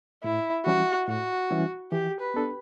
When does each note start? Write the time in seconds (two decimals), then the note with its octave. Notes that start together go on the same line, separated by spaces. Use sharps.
0.24 A2 E4
0.66 E3 G3 C#4 E4 F#4
1.07 A2 F#4
1.50 E3 G3 C#4 E4
1.92 E3 G4
2.21 B4
2.34 B3 D4 A4